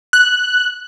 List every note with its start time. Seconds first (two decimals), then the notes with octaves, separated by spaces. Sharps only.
0.13 F#6